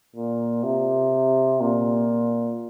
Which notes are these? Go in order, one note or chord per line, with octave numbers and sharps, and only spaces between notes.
A#2
C3
A#2